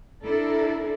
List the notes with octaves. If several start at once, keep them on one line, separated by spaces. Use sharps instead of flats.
D4 E4 A4 A#4 D5